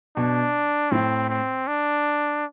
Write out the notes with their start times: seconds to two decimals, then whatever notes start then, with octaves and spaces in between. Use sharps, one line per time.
0.17 B2 D4
0.92 A2 C4
1.30 C4
1.67 D4